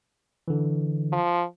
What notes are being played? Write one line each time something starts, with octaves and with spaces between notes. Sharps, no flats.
D3 E3
F3